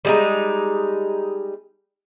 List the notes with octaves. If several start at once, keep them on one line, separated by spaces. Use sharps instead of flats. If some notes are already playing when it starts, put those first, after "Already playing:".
G3 G#3 D#4